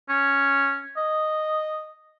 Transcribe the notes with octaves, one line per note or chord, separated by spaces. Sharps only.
C#4
D#5